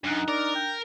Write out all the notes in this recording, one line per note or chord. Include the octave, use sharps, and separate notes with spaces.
F#2 D4 D#4 F6 F#6
A#4 D5
G5